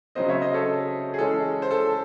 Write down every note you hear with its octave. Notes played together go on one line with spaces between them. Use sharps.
C#3 F#3 C4 C5 D#5
C#5 E5
C5 D#5
A4 C#5
G#4
E3 G#3 C#4 A4
C5
A4